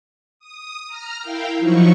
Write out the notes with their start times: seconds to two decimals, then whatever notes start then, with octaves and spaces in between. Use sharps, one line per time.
0.39 D#6
0.87 A#5 F6
1.21 E4 A#4 F5 G5
1.58 F3 F#3 D#4 E4 C#6